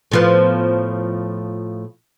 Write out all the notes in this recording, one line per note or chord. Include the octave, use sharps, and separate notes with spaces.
A2 F3 B3